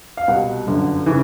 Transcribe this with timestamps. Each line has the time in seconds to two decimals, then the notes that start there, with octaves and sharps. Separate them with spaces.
0.17 F5
0.28 C2 B2 F#5
0.67 G1 F#2 D3
1.06 C#3 E3